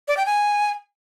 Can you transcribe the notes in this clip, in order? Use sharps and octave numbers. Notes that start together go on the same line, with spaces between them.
D5
G5
G#5